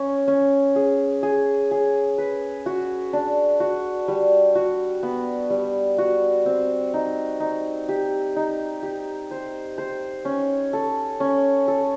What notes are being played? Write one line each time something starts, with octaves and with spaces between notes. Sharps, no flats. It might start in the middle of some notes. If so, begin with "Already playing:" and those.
Already playing: C#4
C#4
G#4
G#4
G#4
B4
F#4
D4
F#4
G3
F#4
B3
G3
F#4
C4
D#4
D#4
G4
D#4
G4
C5
C5
C#4
A4
C#4
A4